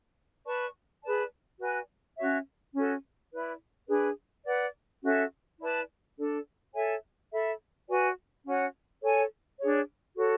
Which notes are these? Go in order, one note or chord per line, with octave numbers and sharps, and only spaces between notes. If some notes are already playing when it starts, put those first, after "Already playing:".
B4 D5 A5 C#6
G#4 B4 D5 A5
F#4 B4 D5 G#5
C#4 F#4 C#5 E5
C#4 F#4 A4
E4 B4 D5
D4 G#4 B4 D5
B4 D5 F#5
C#4 F#4 A4 E5
E4 B4 D5 A5
D4 A4 D5
A4 C#5 E5 G#5
A4 E5 B5
F#4 B4 D5 G#5
C#4 F#4 C#5 F#5
A4 C#5 G#5
D4 G#4 C#5
F#4 A4 C#5